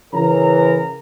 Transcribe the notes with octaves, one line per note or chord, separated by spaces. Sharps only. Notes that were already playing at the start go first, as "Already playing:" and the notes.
C#3 E3 A#4 A#5